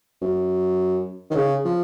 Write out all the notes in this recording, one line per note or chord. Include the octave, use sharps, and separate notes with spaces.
F#2
D#3
C#3
F3